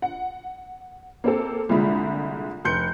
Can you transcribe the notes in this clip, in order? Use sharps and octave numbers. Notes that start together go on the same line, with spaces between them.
F#5
A#3 C4 A4
C2 A#2 D3 G#3 F4 B5
F1 C6 F#6 G6 C#7